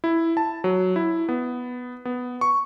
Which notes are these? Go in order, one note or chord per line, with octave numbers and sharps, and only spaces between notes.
E4
A5
F#3
E4
B3
B3
C#6